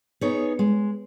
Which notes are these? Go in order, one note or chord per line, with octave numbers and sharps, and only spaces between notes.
B3 D#4 G#4 C#5
G#3